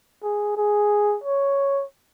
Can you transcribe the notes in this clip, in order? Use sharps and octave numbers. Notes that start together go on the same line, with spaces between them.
G#4
G#4
C#5